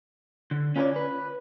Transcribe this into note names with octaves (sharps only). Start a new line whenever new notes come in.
D3
C#4 F4 G#4 B4 C#5 D5
B4